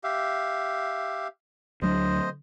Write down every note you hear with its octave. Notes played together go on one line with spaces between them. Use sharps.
G4 E5 F5
D2 F#3 D4 C5 D#5